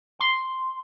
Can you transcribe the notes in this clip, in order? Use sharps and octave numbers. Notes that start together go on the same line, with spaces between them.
C6